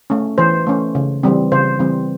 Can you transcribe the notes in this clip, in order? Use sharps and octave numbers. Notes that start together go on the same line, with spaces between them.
A3 C#4
E3 C5
A3 C#4
C#3
E3 G3 C4
C#3 C5
E3 G3 C4